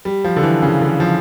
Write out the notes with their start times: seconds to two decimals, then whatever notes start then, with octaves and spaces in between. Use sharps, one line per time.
0.05 G3
0.24 F3
0.36 D3
0.43 E3
0.62 C#3
0.81 D3
1.00 F3